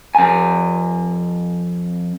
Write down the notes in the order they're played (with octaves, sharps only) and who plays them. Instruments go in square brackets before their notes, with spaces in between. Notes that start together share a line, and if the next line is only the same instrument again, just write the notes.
[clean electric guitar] F2 G#5